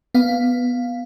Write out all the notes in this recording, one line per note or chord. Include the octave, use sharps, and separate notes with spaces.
B3 F5